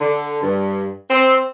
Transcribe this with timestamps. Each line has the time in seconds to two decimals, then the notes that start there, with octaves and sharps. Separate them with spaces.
0.01 D3
0.43 G2
1.10 C4